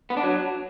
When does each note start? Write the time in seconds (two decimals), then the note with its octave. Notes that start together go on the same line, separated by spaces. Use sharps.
0.10 B3
0.17 D4
0.23 F#3